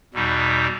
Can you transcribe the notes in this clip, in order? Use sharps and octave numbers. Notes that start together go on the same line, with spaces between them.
E2 B2 G3 D#4